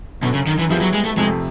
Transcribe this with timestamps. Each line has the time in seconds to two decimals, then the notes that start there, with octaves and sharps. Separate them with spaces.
0.22 F#2 B2 D3 F#3
0.34 C#3
0.47 D#3
0.59 E3
0.70 F3 G3 B3 E4 G#4
0.81 F#3
0.94 G#3
1.05 A3
1.17 F2 C3 F3 G#3 A3